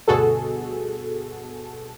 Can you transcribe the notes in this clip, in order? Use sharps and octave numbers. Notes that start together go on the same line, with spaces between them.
D2 G2 B2 F#4 G#4 A4